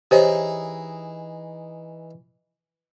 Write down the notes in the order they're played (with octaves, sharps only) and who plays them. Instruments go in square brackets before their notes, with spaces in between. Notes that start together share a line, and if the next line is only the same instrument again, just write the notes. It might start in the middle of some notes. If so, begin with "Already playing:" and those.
[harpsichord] E3 D#4 G#4 [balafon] G4 C5 C#5